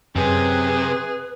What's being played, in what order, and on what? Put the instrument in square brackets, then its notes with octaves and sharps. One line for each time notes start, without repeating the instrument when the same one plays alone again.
[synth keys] F#2 G#5 [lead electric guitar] C3 [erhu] G#4 [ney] B4